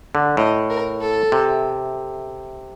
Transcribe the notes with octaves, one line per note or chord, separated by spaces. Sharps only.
D3
A2 D#5
A#4
A4
C3